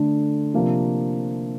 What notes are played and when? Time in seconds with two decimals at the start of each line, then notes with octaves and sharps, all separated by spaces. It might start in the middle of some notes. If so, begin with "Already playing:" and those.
Already playing: D3 A3 D4
0.54 C3 F3 A#3 D4